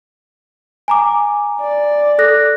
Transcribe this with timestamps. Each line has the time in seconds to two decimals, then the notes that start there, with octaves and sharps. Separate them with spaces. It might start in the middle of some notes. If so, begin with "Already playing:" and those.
0.88 G#5 A#5 D6
1.61 D5
2.19 A4 F#6 A#6